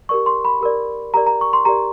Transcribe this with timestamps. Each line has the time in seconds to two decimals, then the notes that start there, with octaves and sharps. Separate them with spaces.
0.09 G4 A#4 D5 C#6
0.26 C6
0.45 B5
0.61 G4 A#4 D5
1.14 G4 A#4 D5 A#5
1.27 A#5
1.41 C#6
1.53 C6
1.65 G4 A#4 D5 A#5